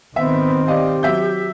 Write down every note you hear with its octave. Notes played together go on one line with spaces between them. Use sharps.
D#3 B3 C4 E5
G4 D5 D#5 F5
F#3 E5 G6